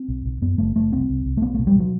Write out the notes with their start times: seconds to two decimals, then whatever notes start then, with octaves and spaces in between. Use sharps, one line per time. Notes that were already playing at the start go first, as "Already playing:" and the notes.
Already playing: C4
0.08 B1
0.25 B1
0.42 F#2 B3
0.58 F#1 A3
0.75 F#1 A3
0.92 C2 C4
1.09 C2
1.26 C2
1.37 A3
1.42 B1 B3
1.54 B2 A3
1.67 G3
1.75 B2 F#3